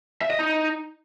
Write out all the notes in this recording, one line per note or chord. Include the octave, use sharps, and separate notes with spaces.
E5
D#5
D#4